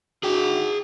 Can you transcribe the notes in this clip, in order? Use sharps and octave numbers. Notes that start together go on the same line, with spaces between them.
D4 E4 F#4 G#4 G5